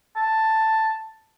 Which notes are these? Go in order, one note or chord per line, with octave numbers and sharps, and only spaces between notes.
A5